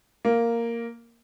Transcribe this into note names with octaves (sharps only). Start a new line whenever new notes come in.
A#3